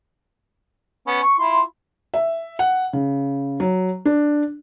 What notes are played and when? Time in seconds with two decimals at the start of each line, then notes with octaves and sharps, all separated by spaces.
1.07 B3 C#4
1.23 C#6
1.38 E4 F4 C6
2.14 E5
2.59 F#5
2.93 C#3
3.60 F#3
4.05 D4